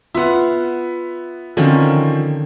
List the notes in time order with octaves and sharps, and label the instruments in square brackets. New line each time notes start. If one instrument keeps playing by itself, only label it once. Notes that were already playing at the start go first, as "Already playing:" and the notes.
[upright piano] B3 E5 [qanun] F4 F#5
[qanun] D3 D#3 C#4 [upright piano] F3 C4